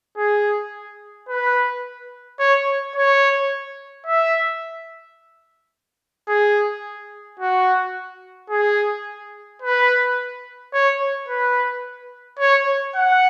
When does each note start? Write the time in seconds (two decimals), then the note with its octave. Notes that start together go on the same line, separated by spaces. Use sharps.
0.17 G#4
1.29 B4
2.39 C#5
2.95 C#5
4.06 E5
6.28 G#4
7.39 F#4
8.50 G#4
9.62 B4
10.73 C#5
11.28 B4
12.39 C#5
12.95 F#5